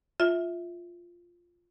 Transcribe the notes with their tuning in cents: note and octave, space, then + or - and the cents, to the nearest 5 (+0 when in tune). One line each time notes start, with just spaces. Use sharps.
F4 +0 E5 -10